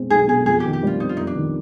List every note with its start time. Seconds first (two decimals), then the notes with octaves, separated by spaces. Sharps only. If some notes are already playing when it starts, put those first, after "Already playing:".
Already playing: B2 G#3 C4
0.10 B1 G#4
0.28 B2 G#4
0.46 F2 G#4
0.60 G4
0.65 D#3
0.73 G4
0.83 G3 F4
1.00 C4 D#4
1.09 F4
1.17 F2 D#4
1.27 D4
1.36 D#3